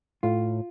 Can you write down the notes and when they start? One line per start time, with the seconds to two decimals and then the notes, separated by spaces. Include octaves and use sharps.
0.23 A2 F4